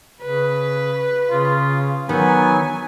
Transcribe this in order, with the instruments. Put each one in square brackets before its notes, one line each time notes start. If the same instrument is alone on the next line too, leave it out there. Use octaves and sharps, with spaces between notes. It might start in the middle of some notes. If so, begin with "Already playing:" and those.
[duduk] C#3 [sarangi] B4
[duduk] C#3 [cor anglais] F4
[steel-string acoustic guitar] D#3 [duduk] F#3 [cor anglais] B3 [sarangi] G#5